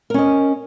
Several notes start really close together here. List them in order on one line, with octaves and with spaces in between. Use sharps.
A#4 C#4 D#5